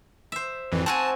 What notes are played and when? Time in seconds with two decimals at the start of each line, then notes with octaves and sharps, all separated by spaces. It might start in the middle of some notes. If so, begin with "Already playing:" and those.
0.32 C5 E5
0.72 G#1 F2 E3
0.86 C4 F#4 G#5 A5